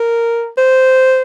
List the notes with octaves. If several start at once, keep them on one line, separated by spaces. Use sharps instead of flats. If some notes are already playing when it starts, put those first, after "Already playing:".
Already playing: A#4
C5